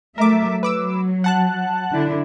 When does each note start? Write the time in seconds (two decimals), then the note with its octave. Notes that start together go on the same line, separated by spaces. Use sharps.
0.18 F#3 A3 A#4 E5 D6
0.63 F#3 B4 D6 E6
1.24 F#5 A5 F#6
1.93 D3 D4 E4